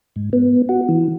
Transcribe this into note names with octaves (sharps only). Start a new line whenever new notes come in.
G#2
B3
F#4
E3